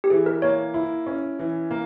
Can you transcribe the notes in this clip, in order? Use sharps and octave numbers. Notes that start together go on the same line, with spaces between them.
G4
E3 G#4
A#4
A#3 C#5
E4
C#4
E3
A#3